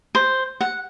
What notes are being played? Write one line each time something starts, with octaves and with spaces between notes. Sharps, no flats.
C5
F#5